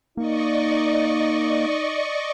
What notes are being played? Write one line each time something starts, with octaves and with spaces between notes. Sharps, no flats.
A#3 D#4 D5 D#5 C#6